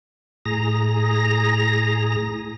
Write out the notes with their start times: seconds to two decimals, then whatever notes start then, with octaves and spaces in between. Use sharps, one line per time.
0.45 A2 G#4 A#5 A#6